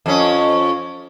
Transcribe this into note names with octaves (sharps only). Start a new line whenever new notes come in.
F2 C#4